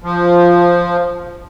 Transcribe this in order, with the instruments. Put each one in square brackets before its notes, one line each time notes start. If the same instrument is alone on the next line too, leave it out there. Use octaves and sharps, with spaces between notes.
[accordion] F3